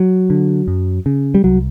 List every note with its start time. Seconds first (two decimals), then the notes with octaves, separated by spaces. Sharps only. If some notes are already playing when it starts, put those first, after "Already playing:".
Already playing: F#3
0.30 D3
0.68 F#2
1.06 C#3
1.35 G3
1.44 C2 F#3